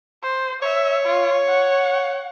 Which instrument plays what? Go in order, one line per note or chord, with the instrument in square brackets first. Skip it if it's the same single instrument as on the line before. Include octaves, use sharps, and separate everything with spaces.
[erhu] C5
[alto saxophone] C#5 [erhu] E5
[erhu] F4
F#5